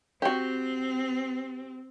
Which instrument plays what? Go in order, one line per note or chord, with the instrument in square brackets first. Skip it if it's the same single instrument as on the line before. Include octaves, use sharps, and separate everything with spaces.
[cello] C4 [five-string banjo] F#4 G4